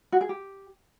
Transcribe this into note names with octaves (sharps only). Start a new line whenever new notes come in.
F#4
G#4
G4